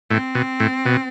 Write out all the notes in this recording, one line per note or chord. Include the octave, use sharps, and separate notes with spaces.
A2 C4
B2
A2
B2